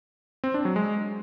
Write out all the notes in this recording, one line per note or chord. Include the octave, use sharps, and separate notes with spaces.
C4
D4
F#3
G#3